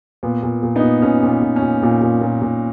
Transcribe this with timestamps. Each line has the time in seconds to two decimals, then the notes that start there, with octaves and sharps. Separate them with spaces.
0.23 A#2 B3
0.43 A#2
0.63 A#2
0.76 B3 D#4
0.83 A#2
1.02 A#2 C#4
1.23 A#2
1.29 B3
1.42 A#2
1.56 C#4
1.62 A#2
1.83 A#2
2.02 A#2
2.21 A#2
2.42 A#2